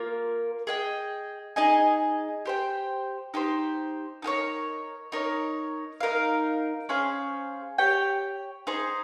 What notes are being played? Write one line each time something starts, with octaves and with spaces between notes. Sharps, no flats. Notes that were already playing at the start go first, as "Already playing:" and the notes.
Already playing: A#3 F4 A#4
G#4 D#5 G5
D#4 G#4 D#5 G#5
G4 C5 G5
D#4 G4 C5
D#4 G4 A#4 C#5
D#4 A#4 C#5
D#4 A#4 F5
C#4 G#4 C5 F5
G4 C#5 G5
D#4 G#4 C5